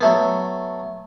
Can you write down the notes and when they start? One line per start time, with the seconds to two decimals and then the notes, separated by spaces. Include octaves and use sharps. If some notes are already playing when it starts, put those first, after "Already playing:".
0.01 F#3 A3 B3